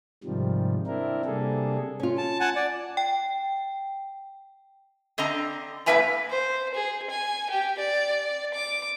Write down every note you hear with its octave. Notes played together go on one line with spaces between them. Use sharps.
G#2 C3 D#3 F3 G3
C4 D4 E4 A#4
C3 G3 A#3 D4 G#4 A4
C#4 F4
A5
F#5 G#5 A5
D5
G5
D3 C4 D#5 A#5
A2 A#3 B4 E5 G#5 A#5
C5
G#4
G#5
G4
D5
D6